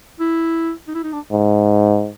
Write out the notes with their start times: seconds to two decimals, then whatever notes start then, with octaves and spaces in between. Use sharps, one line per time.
0.20 E4
0.88 D#4
0.94 E4
1.04 D#4
1.13 D4
1.32 G#2